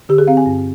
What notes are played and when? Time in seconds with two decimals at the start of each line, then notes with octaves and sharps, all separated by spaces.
0.09 D3 G4
0.18 G#4
0.27 C4 F5
0.37 G#5
0.46 G2